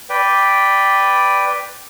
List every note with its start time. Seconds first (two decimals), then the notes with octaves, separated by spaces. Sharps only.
0.10 B4 D5 G5